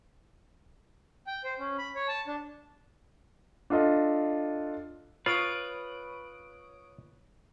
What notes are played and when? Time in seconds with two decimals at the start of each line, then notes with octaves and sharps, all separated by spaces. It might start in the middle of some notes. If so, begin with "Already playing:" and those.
1.27 G5
1.44 C5
1.59 C#4
1.78 B5
1.95 C#5
2.08 A5
2.27 D4
3.70 D4 F4 A4 D#5
5.26 F4 B4 C#5 D#6 D7